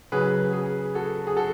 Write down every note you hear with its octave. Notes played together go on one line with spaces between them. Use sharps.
C#3 F#3 G#4 B4
G#4
F#4 A4
G#4
F#4 A4